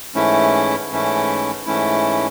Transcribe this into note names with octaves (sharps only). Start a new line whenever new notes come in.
G#2 E3 A3 C#4 E4
G#2 E3 A3 C#4 E4
G#2 E3 A3 C#4 E4